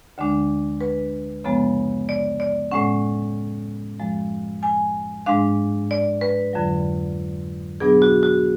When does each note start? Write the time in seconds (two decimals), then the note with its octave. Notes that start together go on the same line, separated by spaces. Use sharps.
0.18 D2 D3 G#3 D4
0.81 B4
1.44 F#2 C#3 F3 G#3 B3
2.09 D5
2.40 D5
2.71 A2 G#3 C#4 F#5
3.99 F#2 F3 G#3
4.63 G#5
5.26 G#2 G#3 D4 F5
5.91 D5
6.21 B4
6.53 F2 D3 F#3
7.80 B2 F#3 B3 D4 G#4
8.02 F#4
8.23 F#4